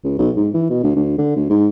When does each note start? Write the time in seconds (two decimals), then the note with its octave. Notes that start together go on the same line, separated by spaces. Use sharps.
0.04 C#2
0.19 B1
0.37 G#2
0.54 E3
0.70 B2
0.84 D2
0.96 D2
1.18 D3
1.36 D2
1.50 G#2